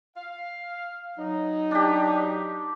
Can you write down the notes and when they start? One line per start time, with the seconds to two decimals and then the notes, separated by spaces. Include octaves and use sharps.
0.16 F5
1.18 F#3 D#4
1.71 D4 G4